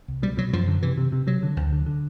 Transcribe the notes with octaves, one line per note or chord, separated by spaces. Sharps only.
C2
B2 G3
B2 F#3
F#2 F3
D3
C3 E3
C3
C3
C3 F#3
D3
D2
D3
D3